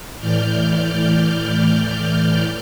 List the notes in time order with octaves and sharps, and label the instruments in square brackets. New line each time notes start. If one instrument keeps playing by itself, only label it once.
[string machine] A2 E3 D5 F6 G6